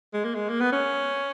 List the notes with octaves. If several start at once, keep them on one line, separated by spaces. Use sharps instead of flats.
G#3
A#3
G#3
A#3
B3
C#4